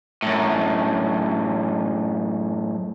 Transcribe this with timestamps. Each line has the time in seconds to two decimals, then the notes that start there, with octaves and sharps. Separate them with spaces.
0.22 F#2 A2